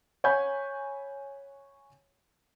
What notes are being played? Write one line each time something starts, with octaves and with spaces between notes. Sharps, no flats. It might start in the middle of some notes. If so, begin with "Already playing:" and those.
C#5 F#5 G#5 B5 G6